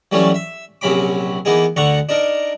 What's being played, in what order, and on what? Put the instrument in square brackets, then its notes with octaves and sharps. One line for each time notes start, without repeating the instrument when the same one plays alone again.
[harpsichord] E3 F#3 G3 A3 C#4
E5
A#1 C3 F#3 C#4 B5 D6
E3 A#3 B3 D#4 G#4
D2 D3 F#5 A#5 C#6
D4 D#4 A#4